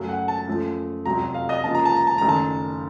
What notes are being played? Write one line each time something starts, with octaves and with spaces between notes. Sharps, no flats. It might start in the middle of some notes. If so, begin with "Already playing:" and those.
Already playing: F#2 C#3 F#3 A3
F#5
A5
F#2 F3 A3
F1 F2 C3 F#3 A#5
F5
D#5
C#2 C#3 F3 A#3 A5
A#5
A5
A#5
A5
F#1 F#2 D#3 A3 A#5
A5